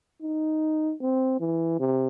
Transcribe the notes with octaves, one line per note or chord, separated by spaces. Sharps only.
D#4
C4
E3
C3